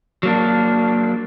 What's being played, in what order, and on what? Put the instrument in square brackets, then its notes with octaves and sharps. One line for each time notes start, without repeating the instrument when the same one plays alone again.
[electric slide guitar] F#3 A#3 D4